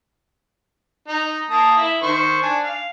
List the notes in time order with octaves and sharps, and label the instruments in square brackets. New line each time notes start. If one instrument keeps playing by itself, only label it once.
[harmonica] D#4
A#3 A5 D#6
E4
D#3 C5 C#6
D4 G#5
F5